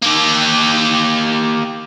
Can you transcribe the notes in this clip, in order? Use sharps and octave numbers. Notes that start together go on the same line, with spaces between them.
A#3 G4